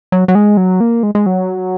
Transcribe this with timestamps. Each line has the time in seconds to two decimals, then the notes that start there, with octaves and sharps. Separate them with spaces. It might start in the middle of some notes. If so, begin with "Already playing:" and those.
0.12 F#3
0.28 F#3
0.35 G#3
0.57 F#3
0.80 A#3
1.03 G#3
1.15 G#3
1.26 F#3